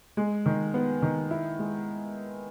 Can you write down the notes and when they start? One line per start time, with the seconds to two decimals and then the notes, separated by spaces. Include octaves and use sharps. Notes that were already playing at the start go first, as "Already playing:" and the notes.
0.17 G#3
0.46 D#3
0.74 B3
1.02 D#3
1.31 E4
1.59 G#3